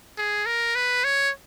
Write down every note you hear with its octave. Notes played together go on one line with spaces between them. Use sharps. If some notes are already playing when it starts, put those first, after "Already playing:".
G#4
A#4
B4
C#5